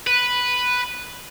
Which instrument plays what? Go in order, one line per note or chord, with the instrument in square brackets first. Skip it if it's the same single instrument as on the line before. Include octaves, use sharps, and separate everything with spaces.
[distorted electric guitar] B4